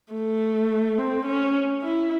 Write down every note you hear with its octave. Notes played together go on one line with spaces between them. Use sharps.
A3
C4
C#4
E4